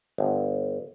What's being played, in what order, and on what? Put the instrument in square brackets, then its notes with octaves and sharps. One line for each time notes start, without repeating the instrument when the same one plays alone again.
[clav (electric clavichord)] G1